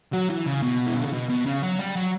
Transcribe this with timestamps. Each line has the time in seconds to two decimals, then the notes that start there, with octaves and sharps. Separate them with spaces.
0.13 F#3
0.30 E3
0.47 C#3
0.63 B2
0.86 E3
0.95 D3
1.04 C#3
1.13 B2
1.29 B2
1.46 C#3
1.63 F#3
1.79 G3
1.96 F#3